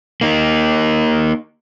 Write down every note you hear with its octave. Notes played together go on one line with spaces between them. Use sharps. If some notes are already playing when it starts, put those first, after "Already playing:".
A#3 D#4